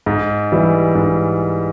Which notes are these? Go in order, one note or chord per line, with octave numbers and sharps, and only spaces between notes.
G#2
E3 G3
G#2